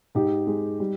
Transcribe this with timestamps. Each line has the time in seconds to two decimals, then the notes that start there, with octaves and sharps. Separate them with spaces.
0.15 G#2 D#4 G4
0.47 G#3
0.80 G3